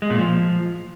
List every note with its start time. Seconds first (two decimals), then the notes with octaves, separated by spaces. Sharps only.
0.02 G#3
0.10 A#2
0.18 F3